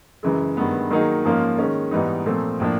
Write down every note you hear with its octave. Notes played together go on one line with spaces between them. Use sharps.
F#2 C#3 E3 G#3
G2 D#3 G#3 B3
D#3 F#3 A#3 D#4 G#4
G#2 F3 A#3 C#4 F4
D#3 G#3 C#4
G#2 E3 G3 B3 D#4
A#2 F3 A3 C4
A2 F3 A#3 D4